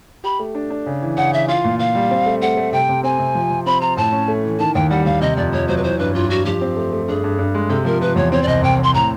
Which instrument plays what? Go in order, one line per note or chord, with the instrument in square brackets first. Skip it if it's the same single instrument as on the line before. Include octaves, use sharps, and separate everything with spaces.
[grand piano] G4 [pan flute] B5
[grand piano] A3
D4
D4
C#3
E3
[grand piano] C#3 [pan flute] F#5
[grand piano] E3 [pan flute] E5
[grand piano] F4 [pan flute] F5
[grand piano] A#2
[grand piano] A#2 [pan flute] F5
[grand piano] G3
C4
A3
[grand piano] A3 [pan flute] F#5
[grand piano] A3
[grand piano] C3 [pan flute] G5
[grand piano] C3
[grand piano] C4 [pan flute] G#5
[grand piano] C3
F3
F3
[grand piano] C4 [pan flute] B5
[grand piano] F4 [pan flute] A#5
[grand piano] A2 [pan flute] A5
[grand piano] C#4
A3
E3
[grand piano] D#3 [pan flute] A5
[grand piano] D#2 [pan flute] G5
[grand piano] G3 [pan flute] F#5
[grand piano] D#2 [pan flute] F5
[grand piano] C3 [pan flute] D#5
[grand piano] F2 [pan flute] D5
[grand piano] F2 [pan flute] C#5
[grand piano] F#3 [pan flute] C5
[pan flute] B4
[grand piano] E3 [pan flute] C5
[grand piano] G2 [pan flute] B4
[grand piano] G2 [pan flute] F4
[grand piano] G2 [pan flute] F#4
[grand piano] F3 [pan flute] G4
[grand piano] C4
A3
A3
[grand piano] G2 [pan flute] G#4
[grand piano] G2
G2
G#3
[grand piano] C3 [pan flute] A4
[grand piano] F3 [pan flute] A#4
[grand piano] F3 [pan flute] B4
[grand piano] E2 [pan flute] C#5
[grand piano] C4 [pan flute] C#5
[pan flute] D5
[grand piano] C2 [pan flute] D#5
[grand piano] C2 [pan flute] G5
[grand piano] C4 [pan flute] C6
[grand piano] A2 [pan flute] A#5